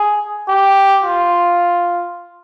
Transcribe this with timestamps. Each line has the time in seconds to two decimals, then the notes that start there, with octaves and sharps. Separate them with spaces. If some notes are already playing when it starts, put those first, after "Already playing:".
Already playing: G#4
0.49 G4
1.04 F4